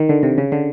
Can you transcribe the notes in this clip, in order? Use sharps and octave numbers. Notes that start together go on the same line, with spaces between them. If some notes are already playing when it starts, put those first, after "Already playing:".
Already playing: D#3
D3
C3
C#3
D3